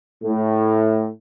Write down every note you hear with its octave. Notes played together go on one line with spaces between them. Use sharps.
A2